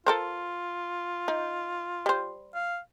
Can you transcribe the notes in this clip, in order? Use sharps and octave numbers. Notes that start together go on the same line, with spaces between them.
F4 A4 A#4 C5
D#4
G3 C5
F5